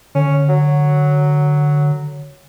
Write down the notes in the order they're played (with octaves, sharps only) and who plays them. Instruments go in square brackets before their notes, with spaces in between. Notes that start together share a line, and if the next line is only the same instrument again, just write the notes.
[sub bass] D3 [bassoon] C#4
[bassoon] F#3